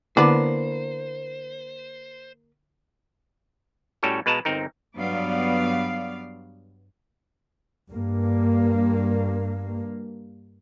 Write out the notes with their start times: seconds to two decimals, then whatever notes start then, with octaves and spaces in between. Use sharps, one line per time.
0.17 D3 A#3 B3 D4 E4 B4 C5
4.03 A2 G3 C#4 F#4 A4
4.26 B2 G#3 B4 F5 A5 A#5
4.45 G1 C4 D#4 A#4
4.96 G2 F#3 B3 D5 F5
7.91 G2 A#3